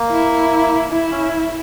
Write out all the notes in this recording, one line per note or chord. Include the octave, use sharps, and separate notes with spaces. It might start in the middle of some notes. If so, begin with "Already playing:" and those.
Already playing: A#3
E4
E4
C#4